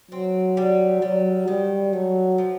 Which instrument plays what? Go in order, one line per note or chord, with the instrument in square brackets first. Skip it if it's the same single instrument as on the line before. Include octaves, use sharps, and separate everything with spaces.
[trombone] F#3 [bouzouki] C4
[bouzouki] G3
[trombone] F#3 [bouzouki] G3
[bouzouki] D#3 [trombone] G3
[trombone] F#3 [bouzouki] A3
[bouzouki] F3